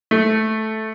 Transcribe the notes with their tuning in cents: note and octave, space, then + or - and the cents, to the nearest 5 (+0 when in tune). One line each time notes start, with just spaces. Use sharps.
A3 -10